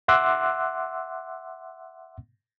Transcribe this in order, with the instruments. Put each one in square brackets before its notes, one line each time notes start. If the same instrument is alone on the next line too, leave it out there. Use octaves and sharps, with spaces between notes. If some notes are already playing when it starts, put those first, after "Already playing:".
[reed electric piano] E5 F#5 C6 D6 E6 F#6